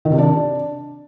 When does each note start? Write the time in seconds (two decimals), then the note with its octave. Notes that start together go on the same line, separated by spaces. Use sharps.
0.05 D#3
0.12 C3
0.18 D4